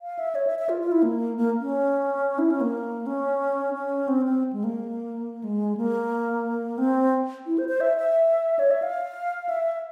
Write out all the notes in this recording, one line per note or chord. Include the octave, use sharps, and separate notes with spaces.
F5
E5
C#5
E5
E5
F4
F4
E4
A#3
A#3
C#4
E4
C#4
A#3
C#4
C#4
C4
C4
G#3
A#3
G#3
A#3
C4
E4
C5
C5
E5
E5
C#5
E5
F5
E5